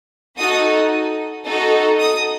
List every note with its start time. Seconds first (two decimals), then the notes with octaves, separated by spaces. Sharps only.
0.38 D#4 F#4 A4 D#6
1.46 D#4 F#4 A4
2.00 D#6